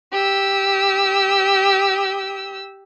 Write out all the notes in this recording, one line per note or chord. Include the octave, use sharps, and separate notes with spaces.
G4 E6